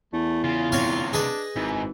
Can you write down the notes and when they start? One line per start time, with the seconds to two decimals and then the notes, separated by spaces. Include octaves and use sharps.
0.13 E2 A3
0.44 C#3 F4
0.72 D2 C3 C4 C#5 F5
1.13 D4 G#4 B4 D#5
1.56 G#1 G#2 E3